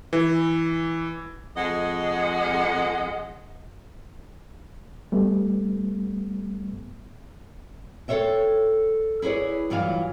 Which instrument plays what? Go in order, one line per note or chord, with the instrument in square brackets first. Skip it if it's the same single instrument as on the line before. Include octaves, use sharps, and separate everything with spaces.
[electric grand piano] E3
[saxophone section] F2 G#3 D#5 F#5
[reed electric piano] G3 A3 B3
[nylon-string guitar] A4 C5 C#5 E5 G5
E4 G#4 B4 C#5 D5
D2 G2 E3 F#3 F4 F5